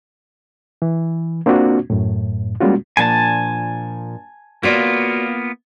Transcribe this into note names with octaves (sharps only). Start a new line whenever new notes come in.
E3
A#3 C4 D4 F4 F#4
F#2 A2
G3 G#3 A#3 C#4 F4 F#4
A#2 F3 D4 G#5 A5
A#3 B3 F4 F#4 C#5 D5